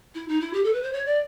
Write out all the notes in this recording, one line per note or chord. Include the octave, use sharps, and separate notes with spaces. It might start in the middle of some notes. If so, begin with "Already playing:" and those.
E4
D#4
E4
G4
A4
B4
C5
C#5
D5